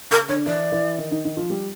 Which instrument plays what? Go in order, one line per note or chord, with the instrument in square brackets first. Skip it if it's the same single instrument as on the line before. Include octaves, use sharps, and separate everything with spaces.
[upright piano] C#3 C#4 [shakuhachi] A#4
[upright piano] D3 D4 [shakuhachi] C#5
[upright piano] E3 E4 [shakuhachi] D5
[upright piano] E3 E4
D#3 D#4
D#3 D#4
D#3 D#4
F3 F4
G3 G4